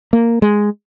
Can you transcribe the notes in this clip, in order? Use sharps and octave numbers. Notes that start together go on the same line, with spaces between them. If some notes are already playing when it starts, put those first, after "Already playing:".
A#3
G#3